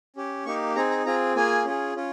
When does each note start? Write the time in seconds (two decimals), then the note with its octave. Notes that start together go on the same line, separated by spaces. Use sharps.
0.16 C#4 G4
0.45 A#3 D#4 G4 C#6
0.76 C4 D#4 G#4 A#5
0.91 A#5
1.06 C4 F4 G#4 A#5
1.35 A#3 F4 G#4 G#5
1.65 C#4 F4 G#4
1.96 C#4 F4